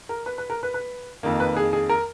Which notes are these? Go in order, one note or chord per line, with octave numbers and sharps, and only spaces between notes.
A#4
B4
B4
A#4
B4
B4
F2 D#3 A#3
B4
G#4
G#4
A#4